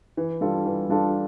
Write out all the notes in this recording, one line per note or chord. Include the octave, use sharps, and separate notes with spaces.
E3
G3 D4 F4 A4
E3
G3 D4 F4 A4